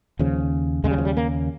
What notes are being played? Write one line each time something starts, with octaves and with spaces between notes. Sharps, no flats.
D#2 C#3 F3
D#2 C#3 G#3
G3
F3
G3
A#3